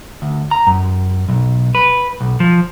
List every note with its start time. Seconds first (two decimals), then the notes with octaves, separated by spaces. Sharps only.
0.22 D2
0.51 A#5
0.67 F#2
1.28 B1
1.75 B4
2.20 B1
2.40 F3